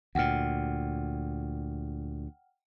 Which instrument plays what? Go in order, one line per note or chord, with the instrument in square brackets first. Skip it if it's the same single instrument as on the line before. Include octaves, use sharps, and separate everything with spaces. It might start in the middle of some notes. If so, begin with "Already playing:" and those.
[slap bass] D2 A#2 [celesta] F#5 G5 F6